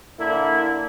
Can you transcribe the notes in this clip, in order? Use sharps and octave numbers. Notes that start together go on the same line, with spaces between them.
D3 A#3 E4